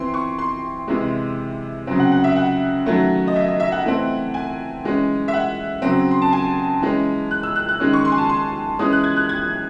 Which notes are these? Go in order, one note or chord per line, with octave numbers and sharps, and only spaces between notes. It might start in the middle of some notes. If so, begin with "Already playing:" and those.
Already playing: E3 C4 C6
C#6
C6
C3 E3 G#3
C#3 F#3 C4
F#5
F#5
E5
F#5
D#3 F#3 A3 C#4
D#5
E5
D#5
E5
F#5
E3 A3 C4
G#5
E3 G#3 C#4
E5
F#5
C#3 F#3 C4
C6
A5
G#5
E3 G#3 C#4
F#6
E6
F#6
F#6
D#3 G#3 C#4
C#6
C6
G#5
A5
C6
E3 G#3 C#4 D#6
F#6
G#6
F#6
G#6